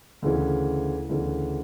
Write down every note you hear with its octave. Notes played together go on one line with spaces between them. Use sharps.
D2 C#3 E3
D2 C#3 E3